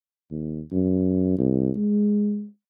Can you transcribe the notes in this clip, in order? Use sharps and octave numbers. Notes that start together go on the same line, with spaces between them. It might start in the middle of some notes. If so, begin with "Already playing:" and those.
D#2
F#2
C2
G#3